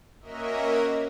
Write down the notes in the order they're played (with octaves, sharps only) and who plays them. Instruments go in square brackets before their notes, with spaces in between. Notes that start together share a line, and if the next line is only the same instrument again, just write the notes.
[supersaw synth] A#3 C#4 F#4 A#4 D#5 E5